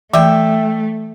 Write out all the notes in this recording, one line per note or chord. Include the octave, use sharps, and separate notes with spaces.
E3 A3 E5 G5